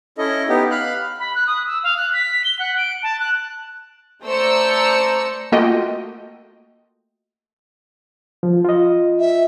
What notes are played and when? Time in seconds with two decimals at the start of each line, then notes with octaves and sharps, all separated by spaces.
0.18 C#4 E4 A4 D#5
0.49 B3 D#4 G4
0.71 F5 B5 F#6
1.19 B5
1.35 F#6
1.47 D#6
1.67 E6
1.83 F5
1.97 F#6
2.13 B6
2.44 G7
2.59 F#5
2.78 D7
3.03 A5
3.19 F#6
4.24 A3 C5 D5 A#5 E6 C#7
5.52 A3 A#3 F4 F#4 D#5 G5
8.43 F3
8.65 F4 D#5
9.19 E5